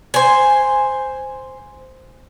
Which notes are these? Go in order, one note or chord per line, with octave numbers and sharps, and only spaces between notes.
C5 G#5